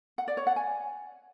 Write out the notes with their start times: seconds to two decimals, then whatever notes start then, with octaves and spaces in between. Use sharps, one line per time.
0.18 F#5
0.28 D5
0.37 C#5
0.47 F#5
0.56 G#5